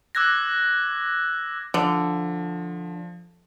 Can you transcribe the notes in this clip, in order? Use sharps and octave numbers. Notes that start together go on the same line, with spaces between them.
D6 E6 F#6 G#6 A#6
D3 F3